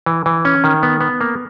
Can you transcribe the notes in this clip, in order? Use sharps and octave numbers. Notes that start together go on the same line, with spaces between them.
E3
E3
C#4
D#3
B3
B3
A#3